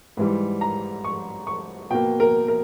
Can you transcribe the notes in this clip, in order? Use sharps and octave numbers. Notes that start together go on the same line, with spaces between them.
G#2 E3 G3
A#5
C#6
C#6
B2 A#3 G5
A#4
A#4